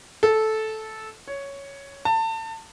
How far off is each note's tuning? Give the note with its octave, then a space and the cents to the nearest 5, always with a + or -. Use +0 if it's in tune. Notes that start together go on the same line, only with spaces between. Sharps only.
A4 -10
C#5 +5
A5 +30